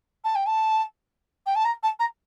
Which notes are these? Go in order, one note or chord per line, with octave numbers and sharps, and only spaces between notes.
A5
G5
A5
G5
A5
A#5
A5
A#5